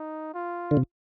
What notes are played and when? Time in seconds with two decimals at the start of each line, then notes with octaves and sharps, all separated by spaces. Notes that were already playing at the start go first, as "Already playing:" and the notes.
Already playing: D#4
0.34 F4
0.71 D3
0.77 C3